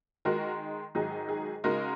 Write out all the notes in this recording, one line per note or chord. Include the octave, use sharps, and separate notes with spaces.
D#3 G#3 D#4 F#4 A#4
G#2 D#3 F#3 D#4 G#4
G#4
C#3 G#3 D#4 F#4 A#4